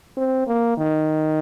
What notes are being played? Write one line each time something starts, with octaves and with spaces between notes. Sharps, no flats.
C4
A#3
D#3